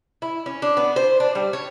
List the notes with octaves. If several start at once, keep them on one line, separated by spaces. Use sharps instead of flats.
E4
C#4
D4
B3
C5
D4
G3
C#5